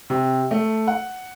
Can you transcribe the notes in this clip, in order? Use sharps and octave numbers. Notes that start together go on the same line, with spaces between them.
C3
A3
F#5